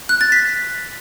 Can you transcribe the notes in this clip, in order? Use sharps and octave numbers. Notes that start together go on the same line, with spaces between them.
F#6
A6
B6